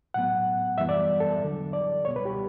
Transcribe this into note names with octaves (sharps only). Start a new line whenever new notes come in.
A2 F#3 B3 F#5
F#2 E3 G3 B3 E5
D5
A4
E2 D3 F#3
D5
C#2 B2 G3 B3 C#5
B4
G4